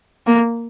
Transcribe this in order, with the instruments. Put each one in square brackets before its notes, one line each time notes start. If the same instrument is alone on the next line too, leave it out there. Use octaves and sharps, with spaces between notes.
[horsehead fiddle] A#3